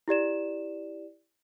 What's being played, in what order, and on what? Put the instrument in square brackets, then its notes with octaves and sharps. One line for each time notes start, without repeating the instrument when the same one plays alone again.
[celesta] E4 G4 D5 E7